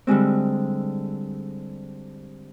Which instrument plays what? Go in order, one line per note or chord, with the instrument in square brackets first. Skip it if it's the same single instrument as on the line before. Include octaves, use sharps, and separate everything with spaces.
[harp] D3 G3 G#3 C4